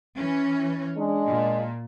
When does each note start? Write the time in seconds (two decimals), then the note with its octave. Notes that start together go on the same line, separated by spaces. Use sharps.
0.16 E3 C#4
0.97 G#3 D4
1.27 A#2